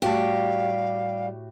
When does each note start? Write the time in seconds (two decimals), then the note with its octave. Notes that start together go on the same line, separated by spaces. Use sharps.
0.02 A2 G3 F#4 G4 F5 A5